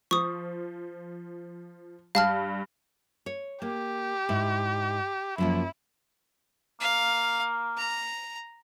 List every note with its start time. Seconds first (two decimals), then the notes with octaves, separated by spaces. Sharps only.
0.11 F3 C#6 D#6
2.15 G2 F5 A5 F6
3.26 C#5
3.62 A#3 G4
4.29 G#2 E4
5.38 F#2 F3 A#3 E4
6.80 A#3 F5
7.77 A#5